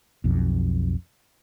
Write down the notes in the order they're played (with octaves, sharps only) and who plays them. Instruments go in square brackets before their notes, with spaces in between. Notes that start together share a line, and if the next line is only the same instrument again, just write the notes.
[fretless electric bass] B1 F2